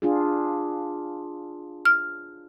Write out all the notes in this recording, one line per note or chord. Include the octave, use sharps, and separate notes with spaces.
D4 F4 G#4
F6